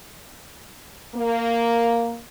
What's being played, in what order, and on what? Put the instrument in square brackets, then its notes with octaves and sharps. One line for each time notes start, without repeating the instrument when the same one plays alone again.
[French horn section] A#3